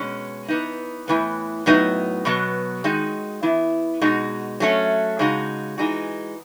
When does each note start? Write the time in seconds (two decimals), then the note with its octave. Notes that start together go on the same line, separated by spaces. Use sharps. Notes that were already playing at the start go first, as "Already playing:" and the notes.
Already playing: B2 G#3 C#4
0.48 E3 B3 D#4
1.08 A2 E3 B3
1.66 A2 F#3 B3 D#4
2.25 B2 F#3 B3
2.84 D#3 G#3 D#4 F#4
3.43 E3 B3 E4
4.01 B2 G#3 D#4 F#4
4.60 F#3 A3 C#4
5.19 C#3 G#3 D#4 F#4
5.78 E3 G#3 D#4 F#4